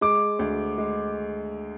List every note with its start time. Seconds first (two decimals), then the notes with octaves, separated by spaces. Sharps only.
0.01 G#3 D6
0.39 D2
0.78 G#3